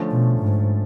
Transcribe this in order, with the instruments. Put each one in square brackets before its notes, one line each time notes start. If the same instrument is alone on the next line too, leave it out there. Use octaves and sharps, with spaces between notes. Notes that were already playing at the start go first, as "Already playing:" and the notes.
Already playing: [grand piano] D3 F3 A3 C#4
[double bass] B2
G#2